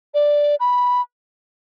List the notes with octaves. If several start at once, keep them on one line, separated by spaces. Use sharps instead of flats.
D5
B5